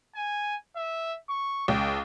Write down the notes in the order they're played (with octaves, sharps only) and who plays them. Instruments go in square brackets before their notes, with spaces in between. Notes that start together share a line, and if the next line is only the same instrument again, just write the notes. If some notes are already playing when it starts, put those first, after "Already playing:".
[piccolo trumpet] G#5
E5
C#6
[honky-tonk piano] C#2 [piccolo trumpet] G5